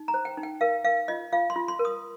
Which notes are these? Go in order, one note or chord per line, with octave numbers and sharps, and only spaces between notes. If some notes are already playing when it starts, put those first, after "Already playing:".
Already playing: D#4
A#5
C5
G5
D#4
G5
A#4 F5
A#4 F5
F4 D#5
F4 F5
C6
F4
C6
A#4
D#6